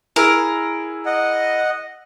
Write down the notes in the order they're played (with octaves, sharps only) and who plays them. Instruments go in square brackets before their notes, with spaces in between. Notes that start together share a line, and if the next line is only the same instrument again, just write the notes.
[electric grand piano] E4 G#4 E6 [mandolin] A#4
[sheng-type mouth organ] D#5 F#5